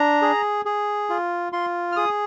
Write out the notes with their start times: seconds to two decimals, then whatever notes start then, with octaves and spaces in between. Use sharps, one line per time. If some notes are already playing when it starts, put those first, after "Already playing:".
Already playing: D4 A#5
0.22 G#4
0.65 G#4
1.09 F4
1.53 F4 C6
1.92 F6
1.96 G#4 D#6